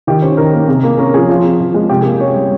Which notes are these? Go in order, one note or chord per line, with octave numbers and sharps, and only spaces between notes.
D#3 G4
C#4 C5
D#3 A#4
A#3
C3 G#4
A#3
C#4 A#4
F3 G#4
F3 F4
C4
F3
G#3
C3 G4
A#3 G#4
C#4 C#5
G3